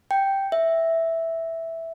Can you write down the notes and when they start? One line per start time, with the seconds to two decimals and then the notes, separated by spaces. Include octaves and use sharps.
0.11 G5
0.52 E5